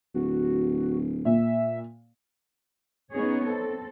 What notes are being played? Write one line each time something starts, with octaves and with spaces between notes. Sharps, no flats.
D1 F#4
A#2 E5
B3 C#4 D#4 G#4 C#5
C4 A4